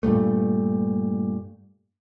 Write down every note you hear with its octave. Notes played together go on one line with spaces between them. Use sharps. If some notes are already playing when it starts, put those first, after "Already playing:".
G2 A#2 G3 A3